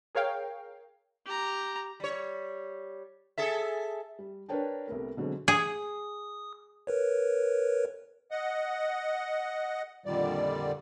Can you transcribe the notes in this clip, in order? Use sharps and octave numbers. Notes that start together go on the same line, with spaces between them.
G#4 A#4 C#5 F5 G5
G4 A#5
G3 C#5
G#4 A4 E5
G3
D4 A#4 B4 C#5 G5 A5
C2 A3 B3 A#4
B2 D3 F#3 G#3 C4
G#4 D#6
A#4 B4 C#5
D#5 F#5
F2 A#2 D3 D#3 G3 D5